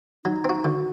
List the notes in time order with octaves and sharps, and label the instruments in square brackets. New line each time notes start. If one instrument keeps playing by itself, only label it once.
[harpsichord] F#3 [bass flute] D#4
[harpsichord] C4 F#4
[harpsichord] D3 [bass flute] F#4